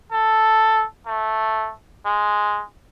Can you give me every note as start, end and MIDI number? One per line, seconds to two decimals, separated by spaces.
0.12 0.85 69
1.06 1.72 57
2.05 2.64 56